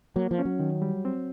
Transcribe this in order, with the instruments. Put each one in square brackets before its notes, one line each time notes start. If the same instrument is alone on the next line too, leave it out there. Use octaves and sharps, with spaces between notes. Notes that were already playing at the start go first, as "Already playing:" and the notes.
[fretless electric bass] F#3 [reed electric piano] A#3
[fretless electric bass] F3
[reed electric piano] C#4
[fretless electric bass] F#3
[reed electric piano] D#3
G3
C4